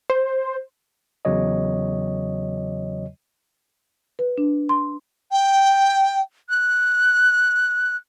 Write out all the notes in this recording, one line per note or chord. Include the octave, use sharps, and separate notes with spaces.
C5
E2 C#3 F#3 C#5 D#5
B4
D4
C6
G5
F#6